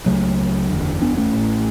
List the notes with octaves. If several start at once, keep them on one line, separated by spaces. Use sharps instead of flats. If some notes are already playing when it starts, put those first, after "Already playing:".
C#2 C#3 F#3 A3
F#1 E2 D3
B3 D4
A3 C#4
A1 A2